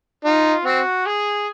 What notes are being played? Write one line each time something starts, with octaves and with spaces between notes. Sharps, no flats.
D#4 F4
C4 F#4
G#4